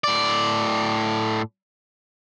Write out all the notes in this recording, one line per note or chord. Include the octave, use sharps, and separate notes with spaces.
A2 D5